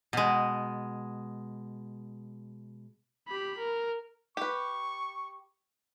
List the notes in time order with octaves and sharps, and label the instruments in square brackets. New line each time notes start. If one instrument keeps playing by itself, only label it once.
[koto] B2 G#3
[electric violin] G4 B5
A#4
[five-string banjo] G4 B4 [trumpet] C#6